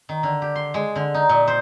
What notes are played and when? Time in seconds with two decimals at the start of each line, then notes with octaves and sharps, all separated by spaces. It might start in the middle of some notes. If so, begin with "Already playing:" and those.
0.09 D#3
0.23 D3
0.42 G4
0.56 C6
0.74 G#3
0.96 D3
1.14 D#4
1.29 A#2
1.48 C5